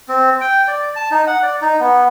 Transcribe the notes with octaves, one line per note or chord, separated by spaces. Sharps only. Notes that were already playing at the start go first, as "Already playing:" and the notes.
C4
G5
D5
A5
D#4
F#5
D5
D#4
B3